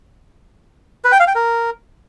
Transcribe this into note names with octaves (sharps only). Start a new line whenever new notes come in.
B4
G5
F5
G5
A#4